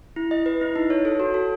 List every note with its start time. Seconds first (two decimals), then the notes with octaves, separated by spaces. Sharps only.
0.16 E4
0.31 D#5
0.46 B4
0.61 E4
0.76 D#4
0.90 C#5
1.05 A4
1.20 F#4
1.34 A4